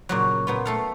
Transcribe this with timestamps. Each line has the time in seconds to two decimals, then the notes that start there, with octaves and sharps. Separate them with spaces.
0.09 A#2 C#3 F#3
0.47 A#2 B3 F4
0.65 A3 A4 F5